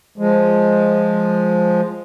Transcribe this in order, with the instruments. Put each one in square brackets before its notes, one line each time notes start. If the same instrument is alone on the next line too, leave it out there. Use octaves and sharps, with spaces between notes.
[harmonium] F3 G#3